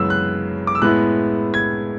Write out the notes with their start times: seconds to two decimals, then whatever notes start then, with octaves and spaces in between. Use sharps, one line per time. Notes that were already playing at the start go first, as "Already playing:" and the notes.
Already playing: F#2 C#3 E3 G#3 B3 E6
0.10 F#6
0.67 D6
0.75 E6
0.82 A2 G#3 B3 E4 F#6
1.54 G#6